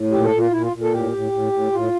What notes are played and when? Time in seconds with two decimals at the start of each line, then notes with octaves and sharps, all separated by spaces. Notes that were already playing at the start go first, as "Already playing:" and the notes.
Already playing: A2
0.11 A#2 G4
0.24 A4
0.32 A#2
0.38 F4
0.51 A#2 E4
0.62 F4
0.72 A#2
0.82 A4
0.91 A2 G4
1.12 A2
1.32 A2
1.52 A2
1.72 A2 F4